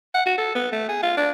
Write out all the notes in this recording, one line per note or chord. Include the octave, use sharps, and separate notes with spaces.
F#5
F#4
A4
B3
A3
G#4
F4
D4